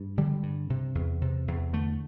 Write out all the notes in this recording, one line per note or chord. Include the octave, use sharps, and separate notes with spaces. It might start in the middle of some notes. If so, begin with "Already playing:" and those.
Already playing: G2
D3 G3
G2
C3
E2
C3
E2
D3 A3